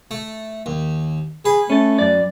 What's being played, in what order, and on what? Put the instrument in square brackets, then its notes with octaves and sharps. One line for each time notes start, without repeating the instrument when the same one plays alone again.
[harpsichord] A3
D#2
[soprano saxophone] G#4 [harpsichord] B4
[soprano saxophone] A3 [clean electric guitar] C#4 A4
[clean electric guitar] F#2 D5